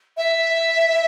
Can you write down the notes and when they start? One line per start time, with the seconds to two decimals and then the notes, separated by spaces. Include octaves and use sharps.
0.18 E5